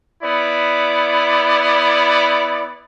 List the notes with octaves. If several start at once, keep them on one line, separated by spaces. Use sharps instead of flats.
B3 E4 D5